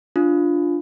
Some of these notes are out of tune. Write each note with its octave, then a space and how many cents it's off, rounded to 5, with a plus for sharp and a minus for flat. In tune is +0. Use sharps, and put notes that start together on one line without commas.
D4 +0 F4 +0